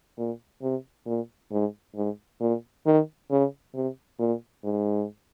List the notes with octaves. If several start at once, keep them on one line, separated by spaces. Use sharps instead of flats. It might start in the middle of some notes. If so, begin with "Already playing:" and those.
A#2
C3
A#2
G#2
G#2
A#2
D#3
C#3
C3
A#2
G#2